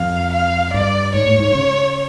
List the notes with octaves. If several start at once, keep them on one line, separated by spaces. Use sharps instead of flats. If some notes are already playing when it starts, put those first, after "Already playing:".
Already playing: F2 F5
F5
G2 D5
G#2 C#5
A2
G#2
C#3